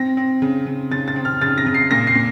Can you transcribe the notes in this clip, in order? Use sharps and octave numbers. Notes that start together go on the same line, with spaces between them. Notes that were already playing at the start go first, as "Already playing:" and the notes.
Already playing: C4 A#6
C4
C#3
C#3
C#3 A6
A6
C4
F6
C#3 A6
A#6
C#3
C7
A#2 A#6
C7
A#2